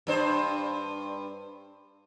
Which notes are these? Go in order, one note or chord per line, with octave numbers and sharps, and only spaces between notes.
G2 D4 C5